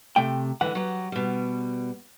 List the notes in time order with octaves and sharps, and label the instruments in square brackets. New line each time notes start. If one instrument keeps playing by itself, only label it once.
[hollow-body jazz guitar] C3 A3 G5
[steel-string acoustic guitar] D3 E3 G#3 [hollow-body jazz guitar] F#5
[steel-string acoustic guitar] F#3 G4
B2 G3